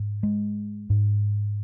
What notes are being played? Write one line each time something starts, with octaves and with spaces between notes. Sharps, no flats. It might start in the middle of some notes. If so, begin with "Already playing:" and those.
Already playing: G#2
G#3
G#2